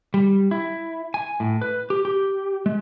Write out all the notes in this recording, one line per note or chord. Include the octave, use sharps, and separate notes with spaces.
G3
E4
G#5
A2
B4
G4
G4
G#3